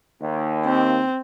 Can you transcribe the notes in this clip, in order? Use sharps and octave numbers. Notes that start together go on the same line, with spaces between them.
D#2
C4